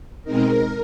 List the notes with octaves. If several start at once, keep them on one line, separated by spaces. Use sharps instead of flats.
B2 G#3 C4 D#4 A#4